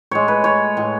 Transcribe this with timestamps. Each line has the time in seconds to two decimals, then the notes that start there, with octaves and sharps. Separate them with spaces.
0.11 A2 G#3 C#5
0.28 B4
0.44 C#5
0.77 A2 G#3